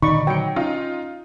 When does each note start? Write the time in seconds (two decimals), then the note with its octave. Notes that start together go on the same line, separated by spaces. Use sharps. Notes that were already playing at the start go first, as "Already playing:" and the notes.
0.02 A#2 D3 D#3 D#4 D5 B5 C#6
0.27 F#3 G5 C#7
0.56 C#4 D#4 F4